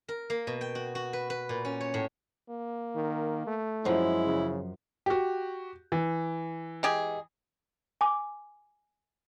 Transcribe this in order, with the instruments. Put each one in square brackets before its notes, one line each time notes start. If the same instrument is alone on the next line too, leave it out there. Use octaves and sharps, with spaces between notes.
[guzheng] A#4
A#3
B2
G5
F#4
F#4
B4
B4
A#2
C#4
C#5
A2
[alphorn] A#3
[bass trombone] D#3
A3
[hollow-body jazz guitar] F#2 F3 [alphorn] G#3 [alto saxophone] E4
[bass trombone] C#3
[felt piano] F#4 G4
E3
[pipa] G#3 G4 G#4
[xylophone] G#5 D6